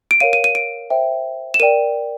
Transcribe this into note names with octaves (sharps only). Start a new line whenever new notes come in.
D7
A#4 C#5 F5 D#7
D#7
D#7
D7
C5 E5 G5
E7
A#4 D5 G5 D#7